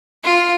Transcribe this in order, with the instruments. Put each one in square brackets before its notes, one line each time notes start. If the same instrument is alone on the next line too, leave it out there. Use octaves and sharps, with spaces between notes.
[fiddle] F4